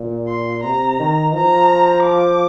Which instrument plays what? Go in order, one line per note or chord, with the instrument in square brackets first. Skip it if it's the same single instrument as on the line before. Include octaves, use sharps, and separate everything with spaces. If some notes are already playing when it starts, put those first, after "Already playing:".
Already playing: [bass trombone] A#2
[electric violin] C6
[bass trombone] C3 [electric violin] A#5
[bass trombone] D#3
[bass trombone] F3 [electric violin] A#5
[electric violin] D6